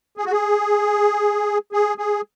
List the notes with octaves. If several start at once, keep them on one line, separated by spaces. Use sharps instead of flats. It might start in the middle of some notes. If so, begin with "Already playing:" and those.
G#4
F#4
G#4
G#4
G#4